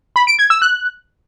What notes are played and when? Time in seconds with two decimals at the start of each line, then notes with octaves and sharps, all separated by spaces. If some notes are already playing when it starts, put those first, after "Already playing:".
0.16 B5
0.27 D7
0.39 G#6
0.50 E6
0.62 F#6